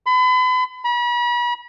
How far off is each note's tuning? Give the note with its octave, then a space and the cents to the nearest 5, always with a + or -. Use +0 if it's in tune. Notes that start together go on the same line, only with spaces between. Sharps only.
B5 +40
B5 -40